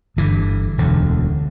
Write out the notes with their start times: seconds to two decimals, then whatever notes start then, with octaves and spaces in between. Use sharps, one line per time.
0.17 G1 G2 D3 E3
0.78 E1 D2 D3